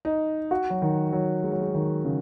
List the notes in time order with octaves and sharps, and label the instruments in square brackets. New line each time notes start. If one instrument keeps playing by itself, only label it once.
[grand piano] D#4
F#4
F#3
D#3
F#3
G#3
F#3
G#3
D#3
C#3